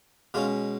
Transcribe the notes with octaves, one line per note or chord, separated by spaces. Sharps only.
B2 G#3 C#4 F4